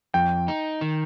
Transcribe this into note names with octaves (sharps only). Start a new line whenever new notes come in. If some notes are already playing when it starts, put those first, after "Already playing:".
F2 G5
D#4
D#3